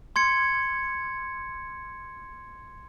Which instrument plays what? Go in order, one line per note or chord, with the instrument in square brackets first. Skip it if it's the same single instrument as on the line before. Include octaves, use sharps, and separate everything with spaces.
[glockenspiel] C6 G#6 C#7